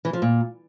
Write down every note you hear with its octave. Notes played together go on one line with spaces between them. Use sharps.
E3
F3
A#2